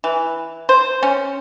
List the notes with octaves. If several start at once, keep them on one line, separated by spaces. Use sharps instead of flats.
E3
C5
C#4